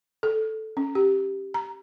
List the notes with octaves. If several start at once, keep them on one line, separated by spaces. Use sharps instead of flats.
A4
C#4
G4
A#5